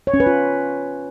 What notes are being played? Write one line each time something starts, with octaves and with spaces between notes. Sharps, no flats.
C#5
C#4
B4
F4